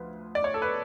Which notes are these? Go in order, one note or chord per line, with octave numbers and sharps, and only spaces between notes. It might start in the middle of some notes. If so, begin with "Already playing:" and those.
Already playing: D2 F3 B4
D5
C#5
A4
B4